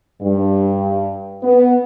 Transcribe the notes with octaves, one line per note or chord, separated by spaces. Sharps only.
G2
B3